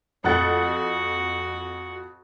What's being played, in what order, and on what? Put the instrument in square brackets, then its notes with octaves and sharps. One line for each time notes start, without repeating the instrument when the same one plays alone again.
[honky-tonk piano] F2 F#5 A6 [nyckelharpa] F#4